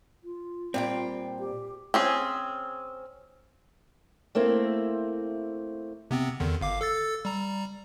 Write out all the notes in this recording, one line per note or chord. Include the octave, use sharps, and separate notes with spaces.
F4
A#2 G3 C4 G5
G4
C4 C#4 G#4
A3 A#3 C4 E4
C3 B3 C4
E2 D3 D#3
G1 F5 D6
A4 E6 A6
G3 A#5